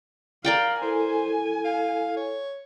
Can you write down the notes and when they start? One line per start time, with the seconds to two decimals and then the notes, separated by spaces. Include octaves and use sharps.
0.45 A#4 D5 F5 G5
0.82 E4 A4 C5 G#5
1.65 F5
2.17 C#5